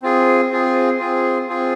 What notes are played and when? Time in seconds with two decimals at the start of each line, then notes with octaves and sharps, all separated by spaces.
0.02 C4 F4 G#4
0.51 C4 F4 G#4
0.99 C4 F4 G#4
1.48 C4 F4 G#4